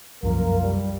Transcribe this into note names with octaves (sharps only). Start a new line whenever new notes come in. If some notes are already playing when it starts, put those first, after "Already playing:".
C2 F#2 F3 A#3 F4 A#4
G3